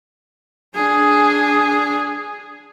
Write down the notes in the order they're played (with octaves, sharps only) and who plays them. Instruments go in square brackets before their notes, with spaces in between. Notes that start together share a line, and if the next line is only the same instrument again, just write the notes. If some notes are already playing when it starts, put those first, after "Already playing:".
[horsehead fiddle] D4 G#4